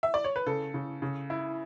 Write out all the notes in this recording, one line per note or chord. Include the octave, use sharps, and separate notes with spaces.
E5
D5
C#5
B4
C#3 A4
C#3
C#3
E4